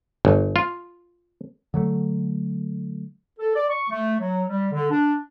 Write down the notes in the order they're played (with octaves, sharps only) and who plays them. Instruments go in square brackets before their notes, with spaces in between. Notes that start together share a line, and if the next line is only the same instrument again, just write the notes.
[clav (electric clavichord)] G1
F4
[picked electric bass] D3 F#3 A3
[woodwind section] A4
D5
C#6
A3
F#3
G3
D3
D4